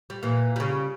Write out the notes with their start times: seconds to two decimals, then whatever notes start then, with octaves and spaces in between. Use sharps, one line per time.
0.10 G3
0.23 A#2 E3
0.56 C#3 G3